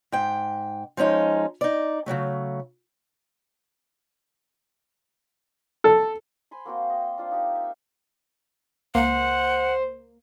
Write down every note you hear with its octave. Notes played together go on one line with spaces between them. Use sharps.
G#2 G5
F3 G#3 C#4 D#4
D#4 D5
C#3 E3 F#3 A3
A4
C5 G#5 B5 C6
A#3 C4 F#4 C5
D#5 G5
D4 F4 C5
D#4 G4
E5
C#2 A#3 C5 F#5